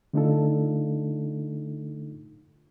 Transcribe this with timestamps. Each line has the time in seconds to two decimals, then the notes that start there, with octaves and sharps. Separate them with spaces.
0.13 D3 A3 D4 D#4 F4 A4